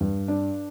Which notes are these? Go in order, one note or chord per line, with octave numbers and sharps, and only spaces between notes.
G2
D4